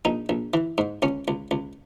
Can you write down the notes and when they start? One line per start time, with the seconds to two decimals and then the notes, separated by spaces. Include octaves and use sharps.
0.05 A#1 D#4
0.29 A#1
0.54 E3
0.78 G#2
1.02 C#2 C#4
1.28 C#2
1.51 C#2